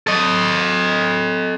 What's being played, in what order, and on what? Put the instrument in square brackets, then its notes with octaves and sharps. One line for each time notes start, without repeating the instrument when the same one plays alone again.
[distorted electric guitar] A4 D#5